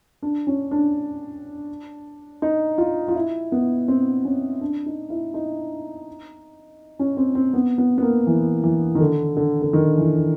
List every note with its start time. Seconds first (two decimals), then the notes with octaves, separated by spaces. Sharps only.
0.22 D4
0.47 C#4
0.71 D4
2.42 D#4
2.78 F4
3.08 F4
3.15 E4
3.52 B3
3.88 C4
4.25 C#4
4.61 D4
4.86 D#4
5.10 E4
5.34 D#4
6.99 C#4
7.17 C4
7.35 C4
7.53 B3
7.78 B3
7.98 B3
8.03 A#3
8.27 E3
8.63 E3
8.95 D#3
9.00 D3
9.37 D3
9.62 D3
9.73 D#3
9.98 E3